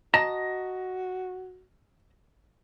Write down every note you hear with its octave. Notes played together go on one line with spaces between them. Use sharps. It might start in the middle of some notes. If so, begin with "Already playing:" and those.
F#4 D#5 A5 A#5 A#6